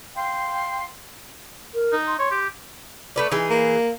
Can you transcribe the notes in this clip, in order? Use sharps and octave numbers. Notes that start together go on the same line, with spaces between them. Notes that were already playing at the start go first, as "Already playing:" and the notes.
F5 G5 C6
A#4
D#4
C6
C#5 C6
G4
A3 B4 D5
E3 D#4 G#4
A#3